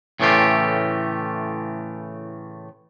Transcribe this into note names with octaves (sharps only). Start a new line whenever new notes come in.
A2 C#3 E3 A3 F4 G4